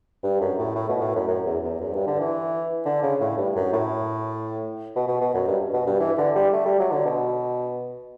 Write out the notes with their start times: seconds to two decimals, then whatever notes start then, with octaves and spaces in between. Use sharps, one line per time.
0.24 G2
0.41 F#2
0.59 A2
0.75 A2
0.89 B2
1.02 A2
1.16 F#2
1.28 F#2
1.46 E2
1.64 E2
1.81 F#2
1.93 G2
2.07 D3
2.20 E3
2.85 D3
3.03 C#3
3.21 A2
3.38 G2
3.56 F#2
3.73 A2
4.96 B2
5.08 B2
5.21 B2
5.35 F#2
5.48 G2
5.74 B2
5.87 G2
6.00 E3
6.18 D3
6.36 G3
6.53 A3
6.66 G3
6.79 F#3
6.92 D3
7.05 B2